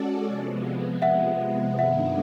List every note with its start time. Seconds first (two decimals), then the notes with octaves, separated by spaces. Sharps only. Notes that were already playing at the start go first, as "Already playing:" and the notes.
Already playing: G#3 C#4 F#4 A4 D5
0.25 C3 F3 G#3 B3
1.02 E5 F#5
1.79 G2 D#3 G#3 B3 D4 E5 F#5